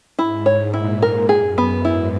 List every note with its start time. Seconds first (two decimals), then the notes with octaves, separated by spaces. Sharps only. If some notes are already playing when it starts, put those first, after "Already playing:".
0.18 G#2 E4
0.46 C#5
0.74 A#2 E4
1.02 A#4
1.29 F#2 G#4
1.58 B3
1.84 G#2 E4